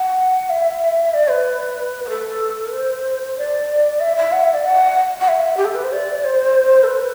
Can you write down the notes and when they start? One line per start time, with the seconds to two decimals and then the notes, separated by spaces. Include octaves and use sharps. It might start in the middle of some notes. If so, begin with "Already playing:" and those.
Already playing: F#5
0.50 E5
1.14 D5
1.30 B4
2.05 B4
2.10 A4
2.73 C5
3.38 D5
4.00 E5
4.17 E5
4.32 F#5
4.43 E5
4.54 D5
4.65 F#5
5.21 F#5
5.28 E5
5.57 G4
5.65 A4
5.75 B4
5.84 C5
5.93 D5
6.25 C5
6.84 A4
6.88 B4